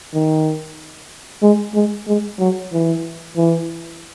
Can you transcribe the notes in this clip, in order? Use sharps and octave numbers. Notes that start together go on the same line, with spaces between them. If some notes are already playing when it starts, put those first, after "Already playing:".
D#3
G#3
G#3
G#3
F#3
E3
E3